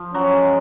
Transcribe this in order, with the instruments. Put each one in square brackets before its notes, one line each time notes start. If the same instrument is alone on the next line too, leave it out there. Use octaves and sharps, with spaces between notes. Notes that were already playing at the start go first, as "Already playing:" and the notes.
Already playing: [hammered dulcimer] F3
[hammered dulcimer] F#3 [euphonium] C#4
[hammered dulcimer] G#3